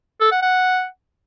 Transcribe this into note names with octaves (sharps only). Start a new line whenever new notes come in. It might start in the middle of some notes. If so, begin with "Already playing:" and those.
A4
F#5
F#5